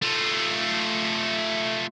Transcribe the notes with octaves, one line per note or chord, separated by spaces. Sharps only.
A3 F4